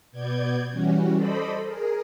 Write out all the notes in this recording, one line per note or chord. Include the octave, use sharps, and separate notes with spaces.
B2 B3 D5 G6 G#6
E3 G3 C#4 F#4
A4 C5 D5 D#5 B5
G#4 A#4